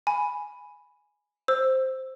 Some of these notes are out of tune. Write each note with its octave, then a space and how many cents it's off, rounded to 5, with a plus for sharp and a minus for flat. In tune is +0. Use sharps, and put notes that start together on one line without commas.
G#5 +0 B5 +0
C5 +0 E6 +5